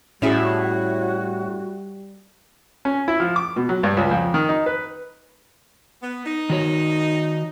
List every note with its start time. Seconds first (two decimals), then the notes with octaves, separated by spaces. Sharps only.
0.22 A2 G3 C#4 E4 F#4 G#4
2.85 C#4
3.08 E4
3.20 F3
3.36 D6
3.56 B2
3.69 F#3
3.83 G2
3.97 C#2
4.11 F2
4.34 D#3
4.49 D#4
4.66 B4
6.01 B3
6.26 D#4
6.50 D#3 F#4 C#5